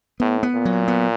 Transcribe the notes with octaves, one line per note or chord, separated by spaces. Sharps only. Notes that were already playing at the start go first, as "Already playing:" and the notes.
A2 B3
B3
A#2
F#3
B3